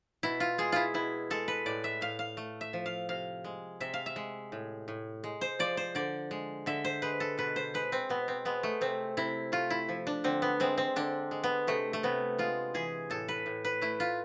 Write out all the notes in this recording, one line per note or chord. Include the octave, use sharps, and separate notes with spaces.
B2 E4
F4
G#3 G#4
E4 F4
B2 E4
G#3 A4
B4
A2 D5
E5
A2 F5
F5
A3
E5
F3
F5
C3 F5
G#3
C3 E5
F5
E5
G#3
A2
A2
G#3
C5
F3 D5
C5
D3 D5
G#3
D3 E5
C5
G#3 B4
A4
B2 B4
C5
G#3 B4
C4
B2 B3
C4
G#3 B3
A3
C3 C4
C3 E4
A3 F4
E4
F3
D4
D3 C4
B3
G#3 C4
C4
D3 D4
G#3
B3
C3 A3
A3
C3 B3
G#3 F4
E3 G#4
A2 A4
B4
A2
B4
A3 E4
F4